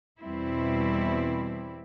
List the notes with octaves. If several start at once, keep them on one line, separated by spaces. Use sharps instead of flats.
E2 B2 G3 C4 E4